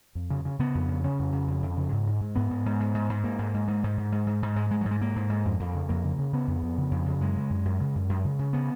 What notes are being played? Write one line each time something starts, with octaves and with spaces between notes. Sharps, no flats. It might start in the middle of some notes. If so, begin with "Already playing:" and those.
F2
C#3
C#3
C#3 B3
F2
C#3
C#3 C#4
F2
C#3
F2
F2
C#3
G#2
G#2
G#2
G#2 B3
G#2
G#2
G#2
G#2
G#2
G#2 A#3
G#2
G#2
G#2
G#2
G#2
G#2
G#2
G#2
G#2 G#3
G#2 G#3
G#2 F#3
G#3
G#2 A#3
G#2
G#2
F2
F2
C#3
F2 A#3
C#3
C#3
C#3 B3
F2
F2
C#3
F2
C#3
F#2 G#3
C#3
F#2
F#2
C#3
F#2
F#2
C#3
C#3
C#3 B3